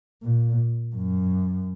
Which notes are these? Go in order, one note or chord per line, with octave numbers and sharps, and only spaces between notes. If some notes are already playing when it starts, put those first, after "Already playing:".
A#2
F#2